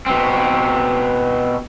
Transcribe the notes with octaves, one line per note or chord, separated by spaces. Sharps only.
B2 C4